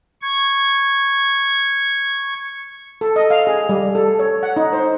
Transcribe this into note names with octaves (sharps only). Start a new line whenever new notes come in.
C#6 G#6
A4
D#5
F5
G#4
G3
A4
C#5
F#5
D#4
C5